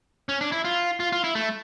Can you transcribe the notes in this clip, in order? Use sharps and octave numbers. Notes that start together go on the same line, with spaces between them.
C#4
D4
E4
F4
F4
F4
E4
A3